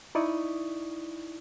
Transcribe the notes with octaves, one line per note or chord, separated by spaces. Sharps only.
D#4 E4 D5 C#6 D#6